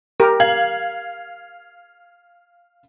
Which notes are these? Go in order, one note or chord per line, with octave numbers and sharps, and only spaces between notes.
G4 A#4
F5 G#6 F#7